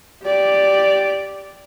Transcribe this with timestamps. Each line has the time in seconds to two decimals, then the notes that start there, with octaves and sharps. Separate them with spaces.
0.24 G4 D5